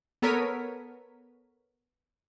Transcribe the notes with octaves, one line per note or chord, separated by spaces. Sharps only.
B3 A4 A#4 C#5 B6 D#7